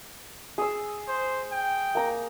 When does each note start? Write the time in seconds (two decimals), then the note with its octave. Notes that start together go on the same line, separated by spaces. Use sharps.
0.58 G#4 E6
1.08 C5
1.52 G5
1.95 A#3 A#5